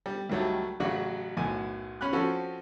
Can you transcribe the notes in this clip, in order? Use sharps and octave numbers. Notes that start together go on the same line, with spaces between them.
G3
C#2 D#3 F#3 G3 A3
A1 C#3 F#3 F#4 F#5
B1 F#2 A2 G#5
C#4 B5 F6 F#6
F3 C4 C#4 F#4 A4